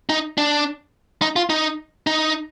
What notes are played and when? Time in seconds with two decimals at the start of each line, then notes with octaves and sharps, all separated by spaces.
0.09 D#4
0.38 D4
1.22 D#4
1.36 F4
1.50 D#4
2.07 D#4